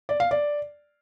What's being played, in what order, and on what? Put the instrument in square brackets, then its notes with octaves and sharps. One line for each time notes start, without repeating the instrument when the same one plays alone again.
[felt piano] D5
F5
D5